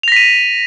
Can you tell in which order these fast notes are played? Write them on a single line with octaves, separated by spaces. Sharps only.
F7 A#6 B6 D#7